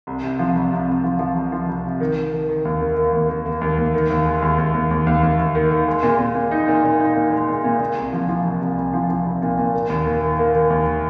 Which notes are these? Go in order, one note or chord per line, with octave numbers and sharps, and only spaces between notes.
C2
C3
F3
C2
C3
C2
F3
F3
C2
F3
C2
C3
D#3
D#3
D#3
D#3
D#2
A#3
A#3
D#2
A#3
A#3
D#2
D#2
D#3
D#2
G#3
D#2
D#2
D#2
D#2
D#2
D#2
D#2
D#3
D#3
G#3
A#2
A#2
A#2
D#4
A#2
A#2
D#4
A#2
G#3
A#2
A#2
A#2
C2
F3
F3
C2
C2
C2
F3
F3
C2
A#2
A#2
A#3
D#2
A#3
D#3
A#3
D#3
D#2